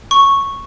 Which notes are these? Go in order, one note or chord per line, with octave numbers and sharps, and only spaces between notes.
C#6